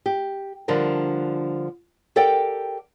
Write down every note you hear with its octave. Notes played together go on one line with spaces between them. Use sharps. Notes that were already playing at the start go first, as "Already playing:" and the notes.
G4
D3 F3 G3 D4 A#4
G4 A4 A#4 D5 F#5 G5